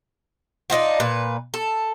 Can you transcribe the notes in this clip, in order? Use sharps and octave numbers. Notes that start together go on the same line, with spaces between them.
D4 D#4 F4 F#4
A#2 B4
A4